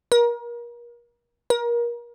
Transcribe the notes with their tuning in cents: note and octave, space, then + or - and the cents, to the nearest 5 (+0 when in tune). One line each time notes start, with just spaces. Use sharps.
A#4 +35
A#4 +30